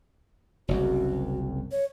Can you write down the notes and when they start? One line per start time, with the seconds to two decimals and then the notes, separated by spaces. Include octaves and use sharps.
0.68 F#1 C2 F#2 F#4
1.72 C#5